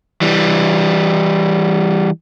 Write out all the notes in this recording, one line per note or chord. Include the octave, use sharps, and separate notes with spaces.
E3 G3